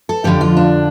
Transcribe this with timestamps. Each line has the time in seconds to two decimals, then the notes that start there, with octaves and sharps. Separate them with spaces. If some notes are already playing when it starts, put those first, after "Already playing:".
0.09 A4
0.24 F2 D3 F3 G4
0.41 F4
0.57 D4